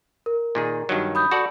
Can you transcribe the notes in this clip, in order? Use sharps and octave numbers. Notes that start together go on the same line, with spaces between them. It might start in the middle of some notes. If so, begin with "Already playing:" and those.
A#4
A#2 D#3 G#4
G2 D#3 F#3
B5 D#6 G6
F#4 A4 D5